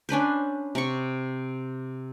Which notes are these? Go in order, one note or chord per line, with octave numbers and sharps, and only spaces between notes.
C#4 D4 B4 C5
C3 C#6